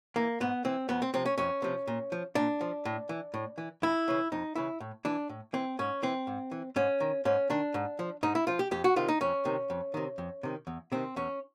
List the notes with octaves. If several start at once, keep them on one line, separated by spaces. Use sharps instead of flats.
E3 A#3
G#2 B3
E3 C4
F2 B3
C4
C3 F3 C4
C#4
F2 C#4
C3 F3
A#2
F3
A#2 D4
F3
A2
E3
A2
E3
F2 E4
C#3 E3
F2 D#4
C#3 E3 E4
A2
E3 D4
A2
E3 C4
G#2 C#4
E3 C4
G#2
E3
G#2 C#4
D#3
G#2 C#4
D#3 D4
G#2
F3
G#2 D#4
E4
F3 F4
G4
F2 G4
F#4
C3 D#3 F4
D#4
F2 C#4
C3 D#3
F2
C3 D#3
F2
C3 D#3
E2
C3 D#3 C4
E2 C#4